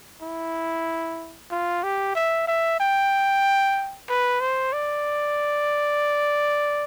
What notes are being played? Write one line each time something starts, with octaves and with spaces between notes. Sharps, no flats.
E4
F4
G4
E5
E5
G5
B4
C5
D5